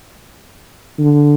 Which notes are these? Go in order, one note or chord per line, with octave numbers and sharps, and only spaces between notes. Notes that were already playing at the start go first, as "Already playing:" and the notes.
D3